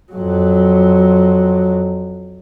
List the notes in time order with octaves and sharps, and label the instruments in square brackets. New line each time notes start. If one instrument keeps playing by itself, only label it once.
[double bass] F2 F#3